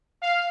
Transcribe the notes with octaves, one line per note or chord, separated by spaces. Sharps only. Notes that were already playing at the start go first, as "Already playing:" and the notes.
F5